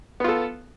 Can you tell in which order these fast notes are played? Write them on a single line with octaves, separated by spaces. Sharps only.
B3 F4 A4